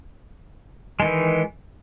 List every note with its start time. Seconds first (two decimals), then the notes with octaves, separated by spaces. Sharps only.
1.00 G#3
1.02 D#3
1.05 E3